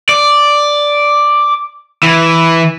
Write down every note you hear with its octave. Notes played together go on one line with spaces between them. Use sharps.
D5
E3